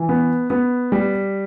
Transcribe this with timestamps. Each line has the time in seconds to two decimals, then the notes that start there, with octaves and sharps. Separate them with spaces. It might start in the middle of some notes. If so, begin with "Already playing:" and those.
Already playing: E3
0.09 B3
0.50 B3
0.92 G3